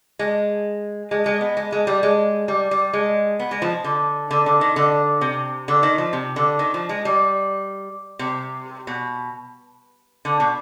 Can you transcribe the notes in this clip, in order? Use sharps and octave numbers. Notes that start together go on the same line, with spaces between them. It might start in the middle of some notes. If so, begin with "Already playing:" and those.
G#3
G#3
G#3
B3
G#3
G#3
G3
G#3
G3
G3
G#3
B3
G#3
F3
D3
D3
D3
D#3
D3
C3
D3
D#3
F3
C3
D3
D#3
F3
G#3
G3
C3
B2
D3
B2